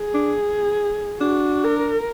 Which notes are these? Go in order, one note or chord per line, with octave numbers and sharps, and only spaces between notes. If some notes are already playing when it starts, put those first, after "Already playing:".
Already playing: G#4
D4
D4 F#4
A#4